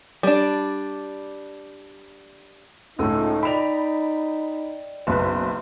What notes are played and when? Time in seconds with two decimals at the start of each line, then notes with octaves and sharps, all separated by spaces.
0.23 G3 D4
2.99 C#2 A2 C#4 D#4 A4
3.43 D5 D#5 G5 B5 F7
5.07 F#1 B1 B4 D#5